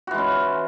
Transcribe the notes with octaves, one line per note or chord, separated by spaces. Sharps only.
E3 G#3 C#4 F#4